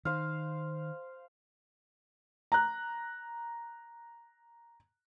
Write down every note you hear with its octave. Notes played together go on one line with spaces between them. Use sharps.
D#3 C5 F5
A#5 F#6